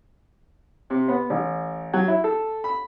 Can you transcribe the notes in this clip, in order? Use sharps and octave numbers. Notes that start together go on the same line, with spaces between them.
C3
B3
A1
F#3
E4
A4
B5